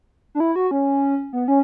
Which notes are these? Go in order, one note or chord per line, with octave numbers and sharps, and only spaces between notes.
D4
E4
F#4
C#4
B3
C#4